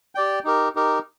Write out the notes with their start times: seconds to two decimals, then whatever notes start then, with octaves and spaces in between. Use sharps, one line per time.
0.15 G4 D5 G5
0.44 D#4 G4 A#4
0.75 D#4 G4 A#4